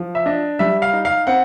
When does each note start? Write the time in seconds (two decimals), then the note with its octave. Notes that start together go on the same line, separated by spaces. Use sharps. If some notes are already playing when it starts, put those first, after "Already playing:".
Already playing: F3
0.15 E5
0.26 D4 D#5
0.59 G3 E5
0.82 F5
0.93 D#4
1.05 F5
1.27 C4 F#5